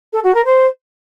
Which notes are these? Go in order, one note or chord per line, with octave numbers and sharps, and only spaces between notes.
A4
F#4
A#4
C5